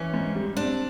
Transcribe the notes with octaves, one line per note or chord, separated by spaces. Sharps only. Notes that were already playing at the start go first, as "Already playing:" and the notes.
Already playing: E3 C#4
G#2
G3
C4 D4